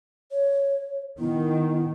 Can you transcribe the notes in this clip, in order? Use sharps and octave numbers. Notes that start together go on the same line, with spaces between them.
C#5
D#3 B3 E4